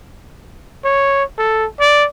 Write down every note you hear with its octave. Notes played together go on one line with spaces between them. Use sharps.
C#5
A4
D5